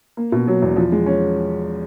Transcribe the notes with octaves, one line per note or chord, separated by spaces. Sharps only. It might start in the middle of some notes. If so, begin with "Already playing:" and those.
A#3
B2
F#3
E2
F3
G#3
C#4